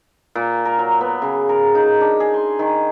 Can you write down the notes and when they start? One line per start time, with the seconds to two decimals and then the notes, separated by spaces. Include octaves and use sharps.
0.35 A#2
0.65 A#4
0.79 F#3
1.01 B3
1.22 C#3
1.49 A#4
1.75 D#4
2.01 D4
2.20 G#4
2.34 C6
2.59 D#3